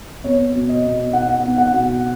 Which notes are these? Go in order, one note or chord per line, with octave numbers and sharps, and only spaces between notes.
B3 C#5
B2
D#5
B2
D#4 F#5
B3
F#5
B2